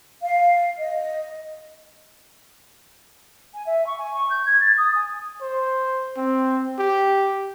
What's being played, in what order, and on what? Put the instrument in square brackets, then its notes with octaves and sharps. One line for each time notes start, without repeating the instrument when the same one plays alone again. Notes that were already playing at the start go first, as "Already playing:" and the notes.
[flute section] F5
D#5
[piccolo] G#5
E5
C#6
G#5
C#6
G6
G#6
A6
D#6
G#5
[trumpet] C5
C4
G4